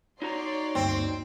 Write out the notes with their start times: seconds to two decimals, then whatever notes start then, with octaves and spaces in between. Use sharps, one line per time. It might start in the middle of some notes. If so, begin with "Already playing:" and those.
0.22 D#4 F#4 C#5 D5 A#5 C6
0.75 D2 G2 A#3 C4